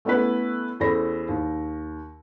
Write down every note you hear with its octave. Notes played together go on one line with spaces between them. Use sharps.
A3 B3 C#4 E4 B4
E2 C#4 A4 C5 B5 A#6
D#2